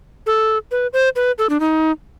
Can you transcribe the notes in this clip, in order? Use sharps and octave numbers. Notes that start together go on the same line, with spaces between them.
A4
B4
C5
B4
A4
D4
D#4